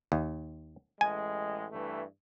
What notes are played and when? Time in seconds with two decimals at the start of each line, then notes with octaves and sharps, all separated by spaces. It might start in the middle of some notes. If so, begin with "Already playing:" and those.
0.12 D#2
1.01 A1 G#3 G#5
1.72 G2 E3 A3